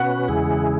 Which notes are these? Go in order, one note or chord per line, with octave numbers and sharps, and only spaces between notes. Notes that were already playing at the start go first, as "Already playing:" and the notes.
Already playing: B2 C#4 F#4 B4 F#5
E2 C#3 G#3 E4 G#4